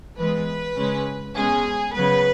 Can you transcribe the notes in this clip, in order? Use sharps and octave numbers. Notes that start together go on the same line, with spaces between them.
E3 G#3 B3 B4
C#3 G#3 C#4
B2 G#3 C#4 G#4
C#3 F#3 B3 B4